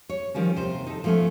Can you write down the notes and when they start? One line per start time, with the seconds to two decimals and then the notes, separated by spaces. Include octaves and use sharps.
0.09 C#5
0.34 D#3 F3 G3 C#4
0.56 D#2 C3 C5
0.87 D#4 A4
1.04 F3 G3 A3 B3 C#4